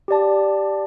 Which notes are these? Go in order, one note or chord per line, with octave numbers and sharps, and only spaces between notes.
G4 D5 A5